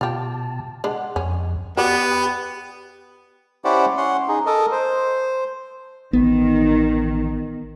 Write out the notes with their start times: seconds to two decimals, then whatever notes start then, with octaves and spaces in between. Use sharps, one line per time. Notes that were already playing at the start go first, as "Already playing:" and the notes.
0.01 B2 F4 G4 A5
0.84 G#3 D4 F#5
1.16 F2 C#4
1.77 B3 F#4 G4 D5 G5
3.65 C#4 E4 G4 C5 D5 F#5
3.97 C#4 F#5 C6
4.28 D#4 G#4
4.46 A4 A#4 D#5
4.72 C5
6.13 A1 D#3 B3